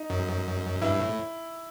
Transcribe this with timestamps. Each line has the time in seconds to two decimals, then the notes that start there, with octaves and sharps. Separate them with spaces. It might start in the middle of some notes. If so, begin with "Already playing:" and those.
Already playing: D#4
0.10 F#2
0.82 G2 E4
1.00 A2